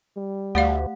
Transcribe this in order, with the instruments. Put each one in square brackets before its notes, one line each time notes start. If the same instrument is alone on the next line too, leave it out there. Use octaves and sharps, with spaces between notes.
[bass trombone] G3
[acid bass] D2 [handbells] A3 F#5 [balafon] G4 D5 F5